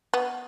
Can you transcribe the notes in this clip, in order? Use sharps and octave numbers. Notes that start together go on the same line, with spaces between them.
B3